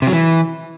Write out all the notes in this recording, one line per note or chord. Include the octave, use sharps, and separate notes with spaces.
C3
F#3
E3